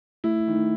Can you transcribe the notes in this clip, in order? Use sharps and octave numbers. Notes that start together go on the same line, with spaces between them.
A3 E4
D#3
A3